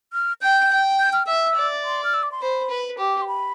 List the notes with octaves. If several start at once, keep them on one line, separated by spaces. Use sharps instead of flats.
F6
G5 G6
G5
G6
F6
E5 E6
D5
C6
F6
E6
D6
C6
C5 B5
B4
G4 D6
C6
B5